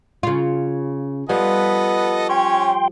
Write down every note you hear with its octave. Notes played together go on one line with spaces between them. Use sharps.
C#3 F4
F3 G3 B3 A4 B4 D#5
C#4 C#5 G5 C6